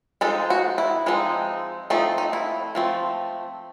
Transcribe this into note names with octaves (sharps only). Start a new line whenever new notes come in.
F3 G#3 C4 D#4 A4
F#4
E4
F3 G#3 C4 D#4
F3 A3 C4 D#4
D#4
E4
F3 A3 C4